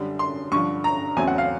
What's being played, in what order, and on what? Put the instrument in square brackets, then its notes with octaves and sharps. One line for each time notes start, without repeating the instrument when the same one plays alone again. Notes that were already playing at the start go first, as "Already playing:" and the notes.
Already playing: [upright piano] F#2 D3 G3
C6
G2 D3 F3 C#6
A#5
E2 C#3 F#3 A3 C4 G#5
F#5
F5